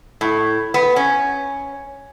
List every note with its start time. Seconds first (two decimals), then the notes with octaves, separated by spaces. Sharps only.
0.21 A2
0.74 B3
0.96 C#4